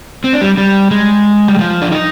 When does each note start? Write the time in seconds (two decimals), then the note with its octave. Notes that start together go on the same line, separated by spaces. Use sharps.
0.24 C4
0.33 D4
0.41 G3
0.58 G3
0.91 G#3
1.48 G3
1.59 F3
1.81 D4
1.91 D#4